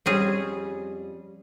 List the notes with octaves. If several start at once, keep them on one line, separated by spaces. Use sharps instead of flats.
F2 G3 C4 C#4 G#4